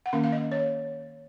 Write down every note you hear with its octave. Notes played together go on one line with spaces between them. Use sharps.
F#5
D#3 A#3 C#4 F5
F5
D#5
C#5